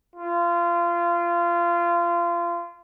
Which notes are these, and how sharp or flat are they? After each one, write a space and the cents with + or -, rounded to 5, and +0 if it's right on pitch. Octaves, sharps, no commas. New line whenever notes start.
F4 -25